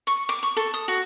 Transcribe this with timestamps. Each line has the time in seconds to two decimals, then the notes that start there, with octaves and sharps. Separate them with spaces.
0.07 C#6
0.29 D6
0.43 C#6
0.57 A4
0.74 D#6
0.88 F#4